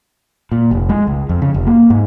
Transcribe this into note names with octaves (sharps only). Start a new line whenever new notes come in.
A#2
F1
G#3
C#2
F2
C#3
F1
A#3
G#2